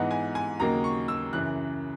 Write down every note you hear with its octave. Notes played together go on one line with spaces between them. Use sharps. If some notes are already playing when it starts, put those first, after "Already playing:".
Already playing: G#2 E3 B3 D#4 F#5
G#5
G#5
D#2 C#3 F#3 A#3 D#4 A#5
C#6
E6
F#2 C#3 E3 F#6